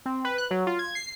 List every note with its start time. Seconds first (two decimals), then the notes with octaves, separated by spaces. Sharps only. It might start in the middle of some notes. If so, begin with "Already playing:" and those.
0.06 C4
0.25 B4
0.38 F#6
0.51 F#3
0.67 F4
0.79 G#6
0.95 C7